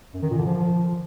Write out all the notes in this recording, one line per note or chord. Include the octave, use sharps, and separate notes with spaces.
F#2
D#3
A#2
D3
F3